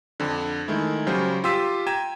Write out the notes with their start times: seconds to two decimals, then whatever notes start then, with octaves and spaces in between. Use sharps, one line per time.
0.20 F2 D3
0.68 D#3 G#3 A3 E4
1.07 C#3 F#3 G3 C5
1.44 F4 G4 C6 E6 B6 D#7
1.87 G5 A#5 G#6 D#7 E7